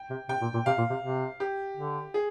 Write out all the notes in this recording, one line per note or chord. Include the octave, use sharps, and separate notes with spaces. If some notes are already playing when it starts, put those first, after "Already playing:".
Already playing: G5
C3
C3 G5
A#2
A#2
C3 F5
A#2
C3
C3
G4
D3
G#4